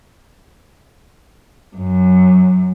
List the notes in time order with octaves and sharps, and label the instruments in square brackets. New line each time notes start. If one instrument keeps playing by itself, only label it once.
[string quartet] F#2